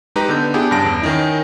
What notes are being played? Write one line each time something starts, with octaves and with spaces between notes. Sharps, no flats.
G#3 D#4 G4 B4 A#5
D3 B3 G6
B3 D4 E4 G4 G#4
G2 C#3 A5 A#6 D7
E2
D#3 C#4 D#4 E4